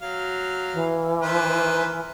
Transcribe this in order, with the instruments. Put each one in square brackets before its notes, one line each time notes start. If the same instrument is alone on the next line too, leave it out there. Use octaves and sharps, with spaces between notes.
[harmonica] F#3 F5
[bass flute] E3
[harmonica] D#3 B4 C5